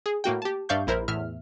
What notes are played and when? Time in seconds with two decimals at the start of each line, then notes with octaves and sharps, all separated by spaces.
0.06 G#4
0.24 A2 A#3 F#4 G5
0.42 G4 A5
0.69 G2 D5 E5 F5 C#6 G6
0.87 A#1 E4 A#4 C5 B5
1.08 E2 A2 E5 F6